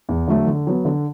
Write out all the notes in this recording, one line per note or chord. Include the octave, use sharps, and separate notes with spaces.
E2
D3 F#3 A3
D3
F#3 B3
D3